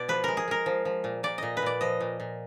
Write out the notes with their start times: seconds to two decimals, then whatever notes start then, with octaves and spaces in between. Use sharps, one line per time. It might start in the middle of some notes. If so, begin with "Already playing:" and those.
Already playing: B2 D5
0.08 F3 B4
0.24 G#3 A#4
0.37 G#4
0.48 G#3 A#4
0.66 F3
0.85 F3
1.04 A#2
1.23 A#2 D5
1.38 A#2 D#5
1.57 B4
1.62 A#2 D5
1.81 F3 D#5
2.01 A#2
2.20 A#2